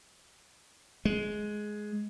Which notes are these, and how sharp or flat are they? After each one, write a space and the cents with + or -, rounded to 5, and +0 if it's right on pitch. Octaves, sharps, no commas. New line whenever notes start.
G#3 +10